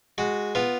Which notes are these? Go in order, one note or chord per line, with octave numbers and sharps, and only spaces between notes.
G#3 F#4
B3 F4